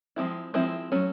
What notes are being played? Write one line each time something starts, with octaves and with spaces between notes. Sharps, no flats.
F3 G#3 C4 E4
F3 G#3 C4 E4
F#3 A3 C#4